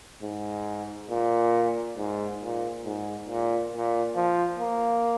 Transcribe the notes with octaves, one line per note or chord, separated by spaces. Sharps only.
G#2
A#2
G#2
A#2
G#2
A#2
A#2
F3
A#3